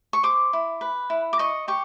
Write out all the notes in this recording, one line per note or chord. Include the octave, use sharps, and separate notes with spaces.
C#6
C5 D6
E4
B4
E4
D6
D#5 C#6
G4 C#6